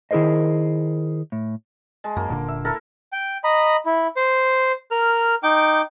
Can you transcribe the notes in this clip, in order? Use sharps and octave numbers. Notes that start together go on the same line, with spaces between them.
D#3 E4 G#4 A#4 C5 D#5
A2
G#3 A5
F#2 A#3
D#1 A#2 D3
E5
E4 A4 A#4
G5
D#5 A#5 B5
E4
C5
A#4 F6
D#4 G5 D6